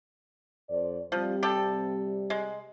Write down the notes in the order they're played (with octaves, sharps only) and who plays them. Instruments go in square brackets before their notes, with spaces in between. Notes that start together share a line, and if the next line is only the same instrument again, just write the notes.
[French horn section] F2 C5 D5
[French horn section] C3 G3 [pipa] F3
[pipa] G4 A4
G#3